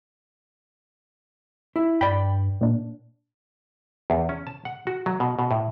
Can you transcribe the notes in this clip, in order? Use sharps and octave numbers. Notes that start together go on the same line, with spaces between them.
E4
G2 D5 G5 B5
A#2 D4
E2
C#4
A5
F#5
F#4
F#3
B2
B2
A2